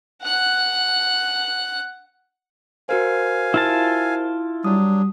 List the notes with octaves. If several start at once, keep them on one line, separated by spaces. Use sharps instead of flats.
F#5 F#6
F#4 A#4 C5 F5 G#5
E4 F4 A5
F#3 G3 D4 D#6